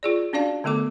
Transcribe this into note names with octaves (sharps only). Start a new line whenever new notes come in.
F4 G#4 D5
C#4 D4 F#4 D5 F5 A5
D3 A3 B3 A4 D6